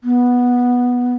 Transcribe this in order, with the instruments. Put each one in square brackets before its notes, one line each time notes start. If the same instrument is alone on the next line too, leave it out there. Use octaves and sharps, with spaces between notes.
[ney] B3